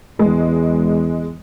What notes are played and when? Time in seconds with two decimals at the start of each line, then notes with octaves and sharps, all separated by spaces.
0.19 E2 G#3